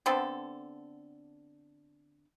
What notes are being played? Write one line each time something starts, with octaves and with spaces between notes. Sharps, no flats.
D3 B3 C4 A4